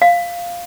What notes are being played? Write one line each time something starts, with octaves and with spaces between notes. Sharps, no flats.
F5